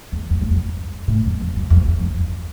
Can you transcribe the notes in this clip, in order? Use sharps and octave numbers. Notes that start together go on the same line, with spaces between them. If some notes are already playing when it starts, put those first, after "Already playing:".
E2
F2
F#2
F2
A2
F2
F2
F#2
F2
E2
F2
F2